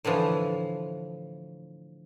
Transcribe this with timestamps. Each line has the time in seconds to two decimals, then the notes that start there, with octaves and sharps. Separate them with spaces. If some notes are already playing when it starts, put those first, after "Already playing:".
0.05 A2 D3 E3 F3